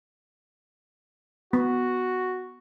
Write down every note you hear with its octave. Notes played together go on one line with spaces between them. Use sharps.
B3 F#4